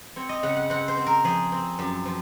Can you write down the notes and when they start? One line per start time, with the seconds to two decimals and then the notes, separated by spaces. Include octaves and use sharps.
0.16 C4 C#5
0.29 D#5
0.43 C#3 F#5
0.57 F#5
0.70 C4 F#5
0.88 C5
0.97 C4
1.06 A#4
1.24 F3 G#4
1.52 C4
1.79 F#2
2.06 F3